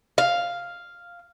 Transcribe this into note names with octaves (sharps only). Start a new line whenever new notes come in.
F5